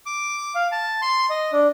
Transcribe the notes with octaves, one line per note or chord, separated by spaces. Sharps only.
D6
F5
A5
C6
D#5
D4